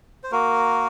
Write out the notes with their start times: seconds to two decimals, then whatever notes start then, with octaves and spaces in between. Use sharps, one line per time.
0.24 C5
0.32 A#3 F#4 A#4